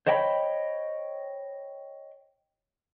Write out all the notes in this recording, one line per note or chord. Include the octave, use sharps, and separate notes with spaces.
C5 C#5 D#5 G5 G#5 B5